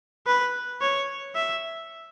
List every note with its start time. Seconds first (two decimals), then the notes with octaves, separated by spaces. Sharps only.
0.26 B4
0.81 C#5
1.35 E5